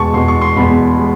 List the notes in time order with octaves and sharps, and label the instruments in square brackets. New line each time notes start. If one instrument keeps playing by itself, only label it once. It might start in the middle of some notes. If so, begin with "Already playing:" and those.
Already playing: [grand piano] E2 B2 G#3 A5 C#6
E2 B2 G#3 C6
C#6
C6
E2 B2 G#3 B5
G#3